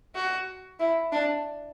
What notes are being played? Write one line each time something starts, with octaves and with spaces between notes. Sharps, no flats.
F#4
E4
D4